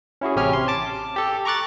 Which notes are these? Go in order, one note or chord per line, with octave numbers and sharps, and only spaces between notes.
C#4 E4 F#4 G#4
A1 C3 C#4 G4 G#5 F6
C6
A5 D6
G4 A4
A#5 C#6 D6 F#6 A6